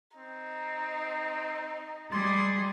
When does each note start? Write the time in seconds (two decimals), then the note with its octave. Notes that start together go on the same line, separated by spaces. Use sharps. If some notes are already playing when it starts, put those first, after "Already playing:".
0.17 C4 D#4
2.12 G3 G#4 C6